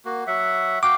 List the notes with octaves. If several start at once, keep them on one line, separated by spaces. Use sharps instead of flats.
A#3 F#4
F#3 E5 F#5
F#4 F5 G5 D6